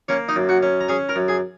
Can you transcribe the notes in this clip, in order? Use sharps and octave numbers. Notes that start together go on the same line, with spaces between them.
A#3 C#4 C#5
D#4 D#5
F#2
F#4 F#5
C#4
A#5
C#4 G#4 G#5
A#4 A#5
F#2
G#4 G#5